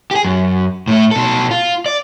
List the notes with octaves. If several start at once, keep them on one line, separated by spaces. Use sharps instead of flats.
G4 G#4
F#2
A2 A3
B2 A4
F4
D5